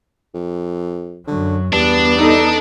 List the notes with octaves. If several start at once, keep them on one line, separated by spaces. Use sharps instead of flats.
F2
F#2 D3 F#3
E2 G2 B3 D4
D#4 A4